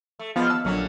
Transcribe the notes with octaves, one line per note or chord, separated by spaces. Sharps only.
A3
F3 G3 G#3 B3 F4
D#2 A5 E6
A#1 D3 F#3 C#4